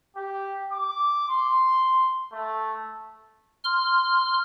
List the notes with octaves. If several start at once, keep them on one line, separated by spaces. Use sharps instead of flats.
G4
D6
C6
A3
C6 F6